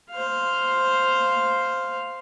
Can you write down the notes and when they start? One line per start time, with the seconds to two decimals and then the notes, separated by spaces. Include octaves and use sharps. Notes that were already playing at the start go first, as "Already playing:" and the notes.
0.11 C5 F5